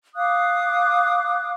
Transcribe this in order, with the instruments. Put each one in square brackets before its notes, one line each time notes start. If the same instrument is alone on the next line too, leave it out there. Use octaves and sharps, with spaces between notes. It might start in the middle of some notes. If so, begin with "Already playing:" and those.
[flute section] F5 D6 D#6 F#6